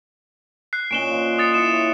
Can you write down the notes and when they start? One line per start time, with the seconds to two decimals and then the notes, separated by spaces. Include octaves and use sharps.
0.73 F#6 C7
0.91 A#2 C#4 D#5 D7 E7 G7
1.11 F4 C5
1.39 D#6 A6 C#7
1.54 E4 C#7 E7
1.73 C#5